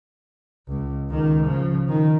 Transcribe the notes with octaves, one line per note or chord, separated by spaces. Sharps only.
C#2
C#2 D#3
C#3 F3
D#3